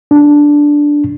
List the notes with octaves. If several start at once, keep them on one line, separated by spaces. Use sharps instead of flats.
D4